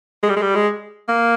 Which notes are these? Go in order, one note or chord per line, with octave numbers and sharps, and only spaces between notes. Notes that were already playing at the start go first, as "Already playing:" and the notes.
G#3
G3
G#3
G3
G#3
A#3